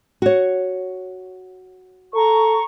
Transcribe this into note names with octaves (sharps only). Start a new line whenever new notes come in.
F#4 C#5
A4 A#5 C#6